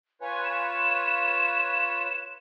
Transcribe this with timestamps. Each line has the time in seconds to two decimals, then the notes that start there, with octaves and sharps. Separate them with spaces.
0.21 F4 B4 C#5 G#5
0.45 E7